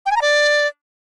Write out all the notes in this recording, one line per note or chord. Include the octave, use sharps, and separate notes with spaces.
G5
G#5
A#5
D5